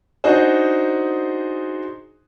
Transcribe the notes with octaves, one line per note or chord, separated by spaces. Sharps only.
D4 D#4 F#4 G#4 C5